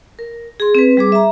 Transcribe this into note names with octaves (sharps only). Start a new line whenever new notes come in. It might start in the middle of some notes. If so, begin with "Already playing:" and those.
A#4
G#4 C6
C4 B4
G3 G#4 D6
E5 A#5